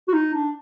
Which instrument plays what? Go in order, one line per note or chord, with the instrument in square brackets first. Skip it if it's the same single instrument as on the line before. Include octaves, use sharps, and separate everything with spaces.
[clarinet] F#4
D#4
D4